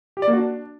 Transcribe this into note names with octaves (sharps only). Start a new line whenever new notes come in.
G4
D5
A#3
F#4
D4